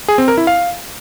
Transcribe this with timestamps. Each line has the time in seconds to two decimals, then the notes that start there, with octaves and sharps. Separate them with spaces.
0.08 G#4
0.18 C4
0.28 A#4
0.38 E4
0.47 F5